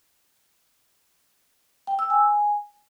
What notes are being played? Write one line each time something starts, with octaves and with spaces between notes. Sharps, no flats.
G5
E6
G#5